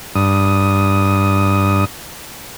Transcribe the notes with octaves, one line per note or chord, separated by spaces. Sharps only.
G2 D#6